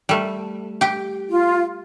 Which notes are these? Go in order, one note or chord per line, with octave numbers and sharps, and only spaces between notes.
G3 A3
G4 G5
F4